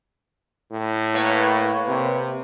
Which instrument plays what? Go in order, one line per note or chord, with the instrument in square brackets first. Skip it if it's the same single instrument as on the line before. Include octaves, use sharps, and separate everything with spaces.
[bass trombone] A2
[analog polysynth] A#3 B4 C#5
[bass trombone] C3